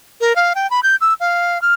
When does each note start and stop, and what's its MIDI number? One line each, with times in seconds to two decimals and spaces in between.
0.21 0.36 70
0.36 0.53 77
0.55 0.69 79
0.70 0.80 83
0.83 0.96 91
1.01 1.14 88
1.20 1.61 77
1.62 1.74 89